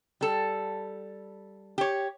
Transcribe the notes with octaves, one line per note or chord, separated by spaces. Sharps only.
G3 A4
G4 C#5